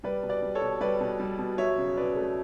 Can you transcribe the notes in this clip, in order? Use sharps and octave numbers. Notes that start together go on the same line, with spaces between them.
G3 B4 D5
B2
B4 D5
G3
A4 C#5
B2
G3 B4 D5
B2
G3
B2
F#3 C#5 E5
C#3
C#3 B4 D5
A3